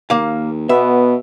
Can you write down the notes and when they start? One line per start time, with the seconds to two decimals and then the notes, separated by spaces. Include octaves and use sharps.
0.10 D#2 A#3 F5
0.69 B2 B3 E5